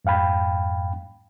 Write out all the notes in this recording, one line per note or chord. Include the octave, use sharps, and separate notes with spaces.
F2 G#2 F5 G5 B5